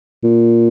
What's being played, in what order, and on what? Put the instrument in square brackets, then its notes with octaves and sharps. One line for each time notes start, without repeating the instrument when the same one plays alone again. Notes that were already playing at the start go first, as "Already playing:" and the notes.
[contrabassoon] A#2